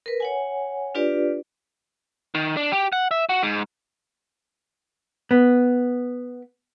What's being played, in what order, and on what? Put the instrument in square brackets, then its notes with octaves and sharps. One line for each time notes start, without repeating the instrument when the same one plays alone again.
[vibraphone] A#4 B4
C#5 F#5 G#5
D4 F4 G4 B4 D5
[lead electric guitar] D#3
D4
G4
F#5
E5
F#4
G#2
[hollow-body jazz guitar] B3